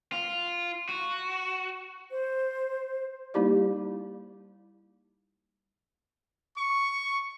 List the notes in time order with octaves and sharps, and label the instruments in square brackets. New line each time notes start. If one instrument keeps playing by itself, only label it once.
[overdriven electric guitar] F4
F#4
[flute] C5
[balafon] G3 A#3 D#4 E4 G4 D5
[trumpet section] C#6